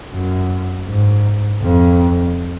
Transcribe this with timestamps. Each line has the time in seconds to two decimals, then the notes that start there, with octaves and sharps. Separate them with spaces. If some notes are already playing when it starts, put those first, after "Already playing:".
0.13 F#2
0.88 G#2
1.63 F2